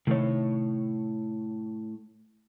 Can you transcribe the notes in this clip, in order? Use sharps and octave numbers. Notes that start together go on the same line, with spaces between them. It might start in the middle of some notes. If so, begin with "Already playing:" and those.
A2 C3 D#3 A3 C#5